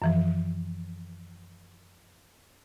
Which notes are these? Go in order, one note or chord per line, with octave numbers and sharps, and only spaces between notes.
F#2 E3 F3